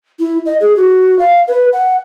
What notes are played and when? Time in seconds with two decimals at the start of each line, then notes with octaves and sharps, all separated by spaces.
0.19 E4
0.46 D#5
0.61 G#4
0.76 F#4
1.19 F5
1.48 B4
1.73 F#5